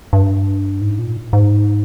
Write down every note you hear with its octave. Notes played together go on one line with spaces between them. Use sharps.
G2
G#2
A#2
G#2